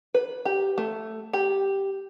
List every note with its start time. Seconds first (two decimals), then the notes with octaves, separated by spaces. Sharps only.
0.14 B4
0.45 G4
0.78 A3
1.33 G4